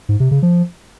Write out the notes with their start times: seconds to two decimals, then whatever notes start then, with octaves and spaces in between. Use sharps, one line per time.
0.09 G#2
0.20 C3
0.31 C#3
0.43 F3